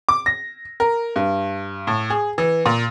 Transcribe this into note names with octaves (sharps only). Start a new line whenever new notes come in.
D6
A#6
A#4
G2
A2
G#4
E3
A#2